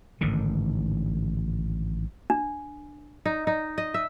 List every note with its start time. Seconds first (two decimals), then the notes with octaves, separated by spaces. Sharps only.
0.21 A1 G#2 D3 D#3
2.30 D4
3.26 D#4
3.47 D#4
3.78 D#5
3.94 E5